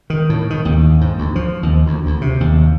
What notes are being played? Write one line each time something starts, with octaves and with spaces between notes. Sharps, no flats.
D#3
A2
D#3
D#2
G#2
D2
F3
D#2
D2
D2
C3
D#2